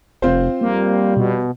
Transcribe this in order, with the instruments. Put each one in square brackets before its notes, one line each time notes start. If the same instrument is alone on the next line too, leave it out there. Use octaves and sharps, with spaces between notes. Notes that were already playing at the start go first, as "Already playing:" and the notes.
[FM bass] F1 [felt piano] C4 F4 C5
[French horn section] F2 G3 [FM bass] A#3
[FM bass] B2